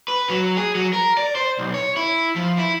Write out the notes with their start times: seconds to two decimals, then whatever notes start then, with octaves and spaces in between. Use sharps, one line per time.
0.08 B4
0.30 F#3
0.57 G#4
0.75 F#3
0.93 A#4
1.17 D5
1.35 C5
1.58 B1
1.74 C#5
1.96 E4
2.36 F3
2.58 E4